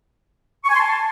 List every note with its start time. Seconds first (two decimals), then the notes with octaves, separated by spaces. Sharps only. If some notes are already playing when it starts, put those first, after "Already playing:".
0.65 C#6
0.70 G#5
0.75 C6
0.80 A5